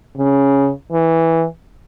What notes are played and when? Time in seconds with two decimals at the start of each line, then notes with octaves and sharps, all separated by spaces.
0.17 C#3
0.92 E3